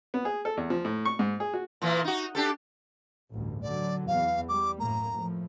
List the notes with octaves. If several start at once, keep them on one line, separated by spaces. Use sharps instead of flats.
B3
G#4
A4
E2
F3
A2
C#6
G#2
G#4
F#4
A#2 E3 A#3
D#4 F#4
D4 G4 A4
A1 D2 G2
D3 F#3 D5
E2 F5
G3 D6
F#2 A2 A#3 A#5
A2 F3